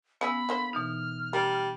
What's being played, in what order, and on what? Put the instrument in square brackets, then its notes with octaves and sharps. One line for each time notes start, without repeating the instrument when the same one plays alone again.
[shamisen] C#3 G#4 F#5 [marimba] B3 E6 [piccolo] B5
[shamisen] D3 A#3 C5
[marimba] B2 E3 D#4 [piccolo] F6
[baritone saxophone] G3 [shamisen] A#4